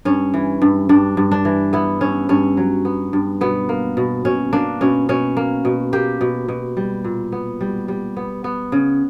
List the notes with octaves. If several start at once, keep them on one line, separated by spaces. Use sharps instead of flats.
G2 C#4
E3
G2
G2 D4
G2
D4
E3
B3 E4
G2 C#4
G2 C#4
F#3
B3
G2
B2 B3
A#3
B2
B2 C#4
A#3 D4
B2 C#4
B2 C#4
A#3
B2
A#3 G4
B2
B2
G3
A#2
B3
G3
G3
B3
B3
C#3